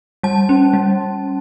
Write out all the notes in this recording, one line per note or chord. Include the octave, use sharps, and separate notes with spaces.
G3 A5
C#4
G3